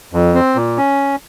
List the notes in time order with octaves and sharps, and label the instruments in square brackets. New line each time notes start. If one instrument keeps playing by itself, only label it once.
[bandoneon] F2
C4
A#2
C#4